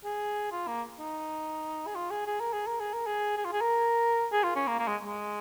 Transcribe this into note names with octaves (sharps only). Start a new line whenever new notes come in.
G#4
F4
A#3
D#4
G#4
F4
G#4
G#4
A#4
G#4
A#4
G#4
A#4
G#4
G#4
F4
G#4
A#4
G#4
F4
C#4
A#3
A#3
G#3
G#3